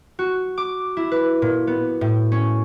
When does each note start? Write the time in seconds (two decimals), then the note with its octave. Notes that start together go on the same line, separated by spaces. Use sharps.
0.19 F#4
0.58 D6
0.97 E4
1.11 B4
1.42 A#2
1.67 B3
2.01 A2
2.32 C#4